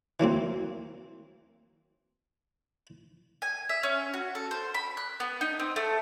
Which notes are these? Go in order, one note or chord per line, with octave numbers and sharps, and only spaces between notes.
E3 F#3 A#3 C4
G#5
E5
C#4
F#4
A4
C5
B5
F#6
B3
D#4
C4
A3